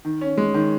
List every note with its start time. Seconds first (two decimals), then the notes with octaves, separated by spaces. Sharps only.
0.05 D#3
0.21 C#4
0.37 G#3
0.54 D#3